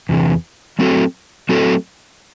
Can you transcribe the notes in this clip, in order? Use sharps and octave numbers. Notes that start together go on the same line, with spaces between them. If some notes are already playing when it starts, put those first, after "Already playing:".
E2 C3 E3
F#3 A3 C4 F#4 A4
F#3 A3 C4 F#4 A4